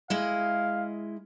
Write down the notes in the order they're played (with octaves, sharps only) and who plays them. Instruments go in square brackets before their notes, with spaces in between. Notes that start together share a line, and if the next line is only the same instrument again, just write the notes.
[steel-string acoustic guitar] G#3 E4 D#5 [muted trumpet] F5